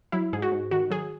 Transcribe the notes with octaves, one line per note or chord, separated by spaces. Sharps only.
F#3 E4
G#2 G#4
F#4
G#2
D#3 F#4
F#3 G#4